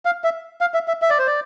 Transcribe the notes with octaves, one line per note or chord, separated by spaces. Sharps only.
F5
E5
F5
E5
E5
E5
D5
C5
D5